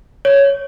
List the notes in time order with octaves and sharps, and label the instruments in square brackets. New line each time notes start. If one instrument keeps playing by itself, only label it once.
[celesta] C#5